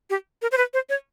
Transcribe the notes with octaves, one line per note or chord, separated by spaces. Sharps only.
G4
A#4
C5
B4
C5
C#5